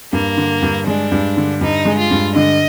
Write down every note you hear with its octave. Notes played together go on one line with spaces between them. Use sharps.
G2 A#3
D3
G2
G#3 D4
G2
D3
G2 D#4
G#3
F4
G2
D3 D#5